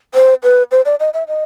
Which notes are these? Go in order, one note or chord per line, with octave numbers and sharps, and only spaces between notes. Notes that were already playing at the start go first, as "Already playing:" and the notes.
C5
B4
C5
D5
D#5
E5
D#5